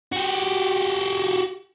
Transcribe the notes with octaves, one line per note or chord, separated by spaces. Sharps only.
F#4 G4